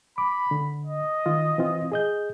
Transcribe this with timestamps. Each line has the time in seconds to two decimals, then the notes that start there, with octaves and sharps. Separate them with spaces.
0.18 B5 D6
0.51 D3
0.86 D#5
1.26 D#3 F4
1.58 E3 C4 F4
1.92 G#4 D#5 G6